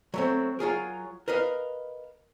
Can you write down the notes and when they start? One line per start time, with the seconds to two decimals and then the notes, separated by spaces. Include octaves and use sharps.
0.14 F#3 A3 C4
0.59 F#3 F4 G#4 A#4
1.28 A#4 B4 D#5 F5